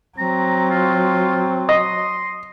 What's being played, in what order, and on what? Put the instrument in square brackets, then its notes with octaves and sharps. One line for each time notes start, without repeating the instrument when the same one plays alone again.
[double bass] F#3 [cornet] C4 [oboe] A#5
[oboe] F4
[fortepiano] D#5 [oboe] C6